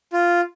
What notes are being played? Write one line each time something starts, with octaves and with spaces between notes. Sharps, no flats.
F4